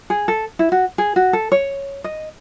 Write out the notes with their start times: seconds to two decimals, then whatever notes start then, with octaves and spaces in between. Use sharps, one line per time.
0.10 G#4
0.28 A4
0.59 E4
0.72 F#4
0.98 G#4
1.16 F#4
1.33 A4
1.52 C#5
2.04 D#5